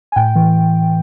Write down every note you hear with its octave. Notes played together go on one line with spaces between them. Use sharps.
G#5
A2 G5
E3